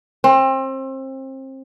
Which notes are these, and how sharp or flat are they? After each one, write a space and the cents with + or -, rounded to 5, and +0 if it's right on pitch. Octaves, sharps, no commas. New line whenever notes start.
C4 +30